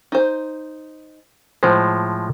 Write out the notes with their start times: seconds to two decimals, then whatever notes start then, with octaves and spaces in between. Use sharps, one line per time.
0.12 D#4 C5
1.63 A2 F3 G#3 C5